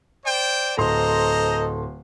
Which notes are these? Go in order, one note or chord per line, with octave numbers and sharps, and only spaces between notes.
C5 D5 G5
D1 A4 C5 D#5 A#5 C6